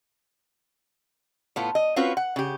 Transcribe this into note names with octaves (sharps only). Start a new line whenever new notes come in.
A2 B3 F4
D#5
C4 C#4 F4 F#4 B4
F#5
C#3 G4